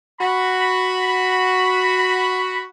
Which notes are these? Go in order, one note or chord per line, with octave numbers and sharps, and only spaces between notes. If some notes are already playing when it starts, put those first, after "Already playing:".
F#4 B5